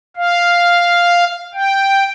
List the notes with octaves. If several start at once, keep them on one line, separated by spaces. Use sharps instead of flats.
F5
G5